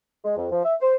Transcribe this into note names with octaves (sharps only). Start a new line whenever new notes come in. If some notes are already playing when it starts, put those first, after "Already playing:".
G#3
F2
F3
E5
C5